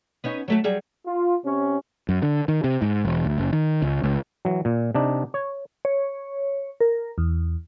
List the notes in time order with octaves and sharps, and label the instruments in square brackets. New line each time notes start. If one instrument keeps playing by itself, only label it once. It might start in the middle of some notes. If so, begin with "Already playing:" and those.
[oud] B3 C#4 D#4
F#3 A3 F#4
F#3 G3 G#4
[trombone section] F4
C3 C#4
[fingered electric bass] F#2
D3
D#3
C3
G#2
E1
D2
F#1
D#3
C#2
C#2
[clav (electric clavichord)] E3 F#3
A#2
C3 D4 D#4
C#5
[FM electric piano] C#5
A#4
E2